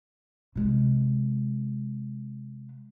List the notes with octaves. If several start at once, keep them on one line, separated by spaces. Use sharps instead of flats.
C3 G#3